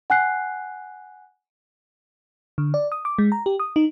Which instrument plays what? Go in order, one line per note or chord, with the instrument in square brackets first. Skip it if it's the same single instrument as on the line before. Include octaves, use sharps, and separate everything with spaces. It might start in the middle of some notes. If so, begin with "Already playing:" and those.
[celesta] F#5 G#5 F#6 C7
[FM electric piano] D3
D5
D#6
D6
G#3
A#5
G4
D#6
D#4